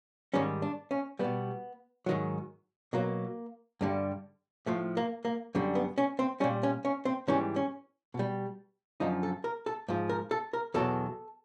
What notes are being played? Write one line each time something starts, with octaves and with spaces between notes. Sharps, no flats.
G#2 D#3 G3 C#4
D4
C#4
B2 G3 B3
G#2 D#3 F#3
B2 F#3 A#3
G2 D3 G3
A2 F3 A3
A#3
A#3
F#2 D3 G3
B3
C#4
C4
A#2 G3 C#4
C#4
C#4
C4
G#2 E3 G3 C#4
C#4
B2
G3
F#2 D3 F3 D#4
A4
A#4
A4
G#2 F3
A#4
A4
A#4
E2 B2 F#3 A4